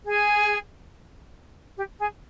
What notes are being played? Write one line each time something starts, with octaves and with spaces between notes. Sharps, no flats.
G#4
G4
G#4